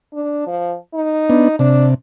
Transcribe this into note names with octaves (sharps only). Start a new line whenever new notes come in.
D4
F3
D#4
B3 D4
C3 D4